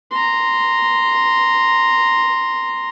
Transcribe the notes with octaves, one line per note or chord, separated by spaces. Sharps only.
A#5 C6